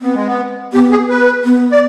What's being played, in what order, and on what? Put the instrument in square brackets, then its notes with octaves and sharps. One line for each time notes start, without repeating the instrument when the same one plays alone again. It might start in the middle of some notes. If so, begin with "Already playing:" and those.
[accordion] B3 [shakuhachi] C4
[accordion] G#3
B3
[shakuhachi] B3 [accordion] G4
[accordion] G#4
B4
[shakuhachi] B3
[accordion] D5